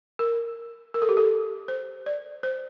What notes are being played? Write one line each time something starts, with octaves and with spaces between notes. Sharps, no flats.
A#4
A#4
A4
G4
A4
C5
D5
C5